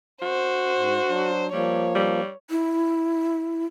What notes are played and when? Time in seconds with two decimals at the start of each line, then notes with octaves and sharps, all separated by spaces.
0.22 F#4 C5
0.76 G#2
1.09 F#3 D4
1.53 F3 G3 A#3 C#5
1.95 G3
2.50 E4